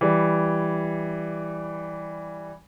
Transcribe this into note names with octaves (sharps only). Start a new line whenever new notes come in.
E3 G3